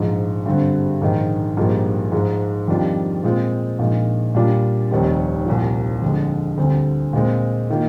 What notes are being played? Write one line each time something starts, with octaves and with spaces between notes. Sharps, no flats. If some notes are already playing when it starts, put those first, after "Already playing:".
Already playing: A#1 G#2 F3
G2 D3 G3 C4
A#1 G#2 D#3
A#1 G#2 G3 A#3 F4
G#2 F3 G#3
F2 D#3 G3 D4 F4
A#2 G#3 C4 F4
A#1 A#2 G#3 D#4
A#2 G3 D4 F4
F1 D#2 D#3 G3 C4
C2 A#2 F3
F2 D3 G#3
D2 D3 G3 C4
A#2 G#3 C4
D#3 A#3 F4